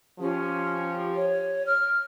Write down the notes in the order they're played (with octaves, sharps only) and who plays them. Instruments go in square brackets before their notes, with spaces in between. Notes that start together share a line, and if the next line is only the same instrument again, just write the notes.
[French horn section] F3 G4 [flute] C#4
[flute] C#5
F6